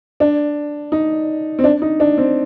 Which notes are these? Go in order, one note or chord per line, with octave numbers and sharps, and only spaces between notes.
D4
D#4
C4
D4
D#4
D4
C4